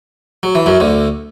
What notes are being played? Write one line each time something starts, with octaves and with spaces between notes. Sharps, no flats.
F#3
E3
F#2 F#3
D2 D3